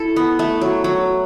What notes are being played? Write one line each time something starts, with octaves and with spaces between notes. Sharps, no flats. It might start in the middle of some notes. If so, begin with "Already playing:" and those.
Already playing: E4 A4
B3
A3
F#3
F#3